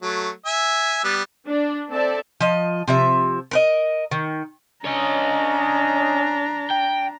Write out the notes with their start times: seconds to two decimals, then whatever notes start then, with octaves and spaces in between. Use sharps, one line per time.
0.02 F#3 A3
0.46 E5 G#5
1.04 G3 B3
1.49 D4
1.89 C4 A4 D5 E5 A5
2.40 F3 D#5
2.88 C3 F3 E5
3.51 A#4 B4 D#5
4.11 D#3
4.85 C#4 D4 C#5 D#5 A#5
6.71 G5